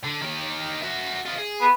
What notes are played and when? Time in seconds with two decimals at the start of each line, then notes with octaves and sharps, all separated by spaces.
0.04 D3
0.22 D#3 G4
0.82 F#4 E5
1.26 F4 D#5
1.38 G#4
1.61 B3